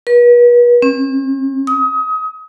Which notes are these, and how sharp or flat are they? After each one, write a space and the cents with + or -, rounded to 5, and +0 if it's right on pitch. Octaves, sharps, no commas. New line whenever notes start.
B4 -40
C#4 -45
D#6 +30